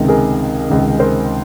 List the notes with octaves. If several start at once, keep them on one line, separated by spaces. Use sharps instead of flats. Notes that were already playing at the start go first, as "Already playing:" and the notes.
Already playing: C#2 C3 D#3
G#4 A#4
C#2 C3 D#3
A#4 C5